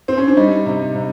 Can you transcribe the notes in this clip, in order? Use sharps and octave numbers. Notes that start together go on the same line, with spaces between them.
C4
C#4
D4
G3 D#4
C3
C3